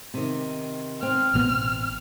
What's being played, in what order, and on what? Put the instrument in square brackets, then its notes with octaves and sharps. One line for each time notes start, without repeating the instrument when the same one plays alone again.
[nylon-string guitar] C3 D#3
[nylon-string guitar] C4 [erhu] F6
[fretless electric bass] A1 B2 B3